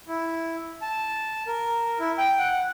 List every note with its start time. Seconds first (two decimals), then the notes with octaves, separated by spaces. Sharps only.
0.08 E4
0.82 A5
1.47 A#4
2.00 E4
2.18 G5
2.39 F#5